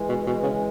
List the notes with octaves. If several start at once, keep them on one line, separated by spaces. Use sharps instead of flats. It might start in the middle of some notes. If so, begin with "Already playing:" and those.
Already playing: E3 G#3
B2
B2
C#3